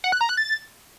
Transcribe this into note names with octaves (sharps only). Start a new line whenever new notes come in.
F#5
F#6
A#5
F#6
A6